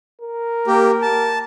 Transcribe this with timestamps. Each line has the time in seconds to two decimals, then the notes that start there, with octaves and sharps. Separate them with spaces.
0.21 A#4
0.67 A#3 G4
1.02 A5